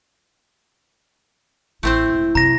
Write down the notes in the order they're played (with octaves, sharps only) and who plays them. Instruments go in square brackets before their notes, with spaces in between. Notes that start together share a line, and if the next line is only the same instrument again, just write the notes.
[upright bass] A1 [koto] A3 C4 C5 [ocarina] E4
[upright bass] E1
[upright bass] F#2 C3 [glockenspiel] A#5 A#6